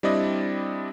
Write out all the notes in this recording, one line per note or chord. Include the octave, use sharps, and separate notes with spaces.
G3 C4 D4 E4 D5 D#5